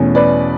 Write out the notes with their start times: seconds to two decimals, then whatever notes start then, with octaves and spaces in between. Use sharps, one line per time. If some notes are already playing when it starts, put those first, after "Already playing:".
Already playing: E2 B2 A3 C#4
0.15 B4 D5